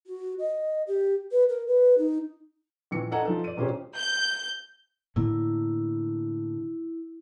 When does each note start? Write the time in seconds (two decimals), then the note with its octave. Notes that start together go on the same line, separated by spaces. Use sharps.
0.06 F#4
0.39 D#5
0.87 G4
1.32 B4
1.49 A#4
1.67 B4
1.98 D#4
2.91 A#1 E3 C#7
3.11 D4 A4 D#5 F#5 G#5 A#5
3.25 F3 D#4 A4
3.44 D5 D#7
3.57 E1 A#2 C#4 G4 G#4 C5
3.97 G6
5.16 A2 D3 A#3 E4